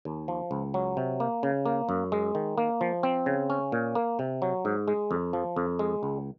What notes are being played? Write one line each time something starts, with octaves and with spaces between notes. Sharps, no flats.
D#2
F3
C#2
F#3
C3
A#3
C#3
A#3
F#2
G#3
D#3
A#3
F3
C4
C#3
C#4
A#2
A#3
C3
F#3
G#2
G#3
F2
F3
F2
G#3
C#2